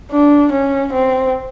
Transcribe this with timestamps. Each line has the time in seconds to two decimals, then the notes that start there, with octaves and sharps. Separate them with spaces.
0.11 D4
0.52 C#4
0.93 C4